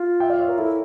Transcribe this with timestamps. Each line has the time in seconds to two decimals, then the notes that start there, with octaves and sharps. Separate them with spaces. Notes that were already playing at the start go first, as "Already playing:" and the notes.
Already playing: F4
0.20 E5 G5
0.30 D5 F5
0.39 C#5 E5
0.48 A#4
0.58 E4 A4